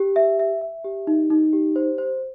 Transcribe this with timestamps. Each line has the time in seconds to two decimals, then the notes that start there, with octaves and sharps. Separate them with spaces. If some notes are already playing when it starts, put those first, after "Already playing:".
Already playing: G4
0.16 E5
0.39 E5
0.61 E5
0.85 G4
1.07 D#4
1.30 D#4
1.53 G4
1.76 C5
1.98 C5